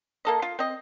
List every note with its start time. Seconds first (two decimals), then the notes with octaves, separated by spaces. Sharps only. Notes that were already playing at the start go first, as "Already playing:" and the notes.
0.25 A#3 A4 D#5
0.42 F4
0.59 C4 D#5